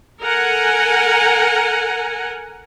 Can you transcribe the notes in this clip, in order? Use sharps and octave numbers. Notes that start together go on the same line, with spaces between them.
A4 A#4 F#5 G#5